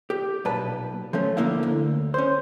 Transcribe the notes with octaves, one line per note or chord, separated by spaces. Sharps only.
G4
B1 A#2 B4 A5
F3 A3 C#4
A2 D3 A#3 E4 F5
D2
C#4 C5